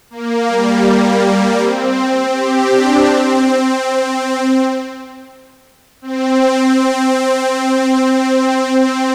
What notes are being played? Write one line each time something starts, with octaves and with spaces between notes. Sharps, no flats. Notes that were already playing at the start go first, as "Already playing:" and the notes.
A#3
G3
A#3
C4
G4
D4
C4
C4